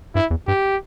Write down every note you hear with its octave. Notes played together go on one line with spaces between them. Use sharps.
G2 E4
E2
G2 G4